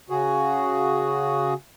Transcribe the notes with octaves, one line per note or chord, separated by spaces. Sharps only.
C#3 F#4 G#4